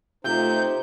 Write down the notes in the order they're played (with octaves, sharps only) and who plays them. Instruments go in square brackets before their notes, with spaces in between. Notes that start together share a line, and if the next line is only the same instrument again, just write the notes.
[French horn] C3 [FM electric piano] A3 F4 E5 [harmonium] D#4 C5 [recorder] G6